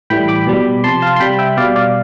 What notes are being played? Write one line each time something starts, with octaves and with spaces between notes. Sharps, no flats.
A2 E3 G3 G5 B5
B5 D6
B2 G3
C3 F3 A5 C6
F5 A5
C6
C3 G3 G5 B5
E5 G5
B2 G3 D5 F5
D5 F5